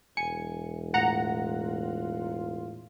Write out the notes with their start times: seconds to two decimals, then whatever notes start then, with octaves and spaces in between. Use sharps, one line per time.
0.17 E1 G#5 C#7
0.94 A2 F4 F#5 A#5